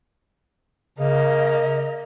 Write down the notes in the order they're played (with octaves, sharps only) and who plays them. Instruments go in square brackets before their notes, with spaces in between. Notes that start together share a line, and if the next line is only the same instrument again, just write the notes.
[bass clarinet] C#3 [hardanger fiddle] A#3 [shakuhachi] D#5